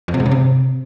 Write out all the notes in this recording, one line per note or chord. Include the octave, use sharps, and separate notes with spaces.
F2
C3
G#2
C#3
C3